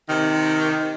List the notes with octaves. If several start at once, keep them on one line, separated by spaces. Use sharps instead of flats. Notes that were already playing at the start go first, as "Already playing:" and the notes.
C3 D#3